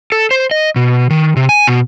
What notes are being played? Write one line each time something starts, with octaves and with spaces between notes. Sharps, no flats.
A4
C5
D#5
B2
D#3
C3
G#5
B2